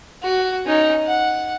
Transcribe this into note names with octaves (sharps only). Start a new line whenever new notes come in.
F#4
C#4 D#4
F#5